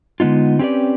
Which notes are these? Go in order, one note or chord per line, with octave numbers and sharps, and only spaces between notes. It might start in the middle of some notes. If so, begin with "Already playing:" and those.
D3 G#3 B3 D#4 F4
C4 C#4 G4 B4 D5